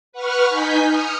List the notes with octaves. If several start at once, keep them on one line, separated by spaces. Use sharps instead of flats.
B4 F#5 C#6 F6
D#4 G#5 G6 B6
D#6 F6 C#7